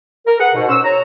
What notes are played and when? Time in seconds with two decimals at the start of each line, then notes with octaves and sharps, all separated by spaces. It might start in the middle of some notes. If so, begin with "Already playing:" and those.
0.27 A#4
0.40 G#4 B4 F#5
0.54 G#2 B2
0.69 C#4 C5 E6
0.84 C#5 A#5